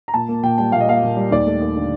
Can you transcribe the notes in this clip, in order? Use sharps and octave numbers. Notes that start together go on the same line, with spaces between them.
A#5
A#2 A5
A#3
A#2 G5
G3 G5
A#2 F5
D#5
A#3 F5
A#2
G3
D#2 D5
A3
D#2
D3